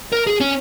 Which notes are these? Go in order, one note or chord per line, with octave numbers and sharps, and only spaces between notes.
A#4
G#4
C#4